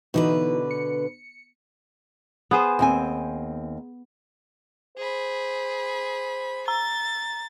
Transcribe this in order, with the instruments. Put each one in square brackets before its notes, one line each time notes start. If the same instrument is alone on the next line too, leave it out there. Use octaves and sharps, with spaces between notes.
[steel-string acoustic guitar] B2 D3 B4 [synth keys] E3 D#4 F#4
[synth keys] C#7
[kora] B3 G#4 C5
[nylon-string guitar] D#2 C4 G#5
[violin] G#4 B5 [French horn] C5
[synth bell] A#5 [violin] A6